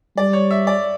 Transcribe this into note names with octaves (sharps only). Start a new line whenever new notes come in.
G3 D5
C#5
E5
D5